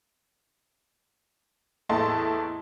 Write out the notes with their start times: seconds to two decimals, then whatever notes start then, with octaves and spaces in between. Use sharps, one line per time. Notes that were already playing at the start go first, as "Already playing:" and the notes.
1.89 E2 A2 E4 D#5 A5 C6